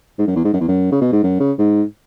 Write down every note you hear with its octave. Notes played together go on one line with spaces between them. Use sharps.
G#2
F#2
E2
G#2
F#2
E2
F#2
C#3
B2
G#2
F#2
C#3
G#2